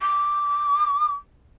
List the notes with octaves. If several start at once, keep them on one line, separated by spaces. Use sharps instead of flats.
D6